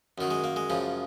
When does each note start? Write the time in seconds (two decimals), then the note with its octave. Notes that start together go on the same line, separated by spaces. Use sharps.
0.18 F#2 D#3 F#3
0.31 G#3
0.44 A#3
0.56 G#3
0.70 F#2 C#3 F3